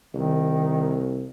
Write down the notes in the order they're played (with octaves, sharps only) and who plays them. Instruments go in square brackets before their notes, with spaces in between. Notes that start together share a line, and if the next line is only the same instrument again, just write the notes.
[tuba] C2 [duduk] D#3